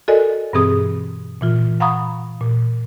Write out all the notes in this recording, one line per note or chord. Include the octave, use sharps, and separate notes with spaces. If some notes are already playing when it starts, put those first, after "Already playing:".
F#4 A4 A#4 D5 D#5 G#5
G2 B2 E3 C4 G#4 D#6
A#2 E3 F4
F5 F#5 A#5 B5 C#6 D#6
A#2